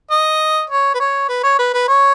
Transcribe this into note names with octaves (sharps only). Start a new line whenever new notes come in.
D#5
C#5
B4
C#5
B4
C#5
B4
B4
C#5